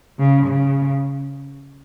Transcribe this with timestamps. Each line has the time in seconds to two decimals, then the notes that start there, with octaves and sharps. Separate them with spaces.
0.19 C#3
0.47 C#3